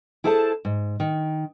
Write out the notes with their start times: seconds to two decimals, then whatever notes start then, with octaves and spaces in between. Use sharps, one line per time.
0.24 E4 G#4 A4 C5 F#5 A5
0.65 G#2
1.00 D#3